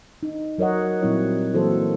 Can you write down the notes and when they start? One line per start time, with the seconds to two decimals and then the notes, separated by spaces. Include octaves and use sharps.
0.23 D#4
0.58 F#3 A#4 C#5 D#5 F#5
1.02 A#2 F#3 G3 C4 E4 C#5
1.54 E3 F#3 A#3 F#4 A4 C5
1.71 A#3